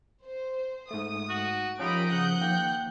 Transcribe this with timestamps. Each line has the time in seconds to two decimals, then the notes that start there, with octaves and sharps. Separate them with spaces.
0.24 C5
0.91 G#2 A3 D#6
1.29 F#4
1.79 F3 C#4 D#4 F4 G4 A#4 B5 D7
2.12 C#3 F#5 F#6 G6
2.41 D#3 A#3 G5